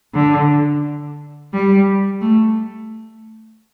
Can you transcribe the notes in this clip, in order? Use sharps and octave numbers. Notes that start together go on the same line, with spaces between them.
D3
G3
A3